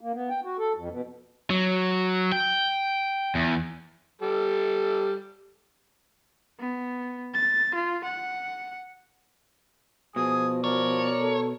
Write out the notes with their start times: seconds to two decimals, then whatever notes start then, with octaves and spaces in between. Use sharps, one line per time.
0.01 A#3
0.14 B3
0.30 G5
0.44 F#4
0.59 A4
0.76 F2
0.91 B2
1.50 F#3
2.32 G5
3.35 E2
4.21 G3 A4
6.60 B3
7.34 A6
7.75 F4
8.04 F#5
10.16 B2 F3 G#4 G#5 D#6
10.64 F3 A#4 C#5 D5
11.20 A4